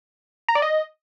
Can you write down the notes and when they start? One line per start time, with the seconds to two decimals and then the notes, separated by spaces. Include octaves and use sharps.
0.49 A#5
0.55 D5
0.62 D#5